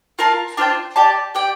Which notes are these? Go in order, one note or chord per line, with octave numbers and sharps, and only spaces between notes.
F4 A#4 F5 A5
D4 F4 C5 G5
G4 D5 A5
G4 D5 G5